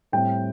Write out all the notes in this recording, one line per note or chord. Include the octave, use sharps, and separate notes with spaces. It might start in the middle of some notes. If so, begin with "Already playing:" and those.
A2 G3 C4 G5